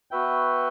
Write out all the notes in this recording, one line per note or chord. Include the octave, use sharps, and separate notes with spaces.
B3 F#4 B4 E5 G5